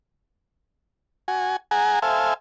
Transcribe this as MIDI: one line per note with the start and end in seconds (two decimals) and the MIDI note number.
1.28 1.56 66
1.28 1.56 80
1.71 1.99 68
1.71 1.99 78
1.71 1.99 80
1.71 1.99 82
2.02 2.34 69
2.02 2.34 72
2.02 2.34 76
2.02 2.34 77
2.02 2.34 80